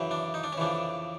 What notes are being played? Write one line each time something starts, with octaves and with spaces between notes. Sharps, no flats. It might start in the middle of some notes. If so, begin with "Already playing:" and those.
Already playing: F#2 C#3 E3
D4
D#4
D4
C#4
F2 C#3 E3 D4